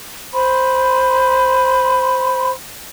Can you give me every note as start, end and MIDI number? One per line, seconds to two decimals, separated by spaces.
0.33 2.51 72
0.33 2.51 83
0.33 2.51 84